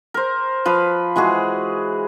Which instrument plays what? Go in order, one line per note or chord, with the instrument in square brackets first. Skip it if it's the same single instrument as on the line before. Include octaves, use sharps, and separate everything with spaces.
[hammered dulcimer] A#4 C5
F3 B4 F5
E3 G#3 F#4 G#4